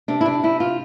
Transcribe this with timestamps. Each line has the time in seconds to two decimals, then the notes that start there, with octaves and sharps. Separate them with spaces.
0.08 C3 D4
0.21 E4
0.26 D4
0.43 C3 E4
0.60 F4